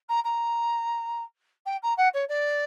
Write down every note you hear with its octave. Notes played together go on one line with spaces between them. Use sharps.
A#5
A#5
G5
A#5
F#5
C#5
D5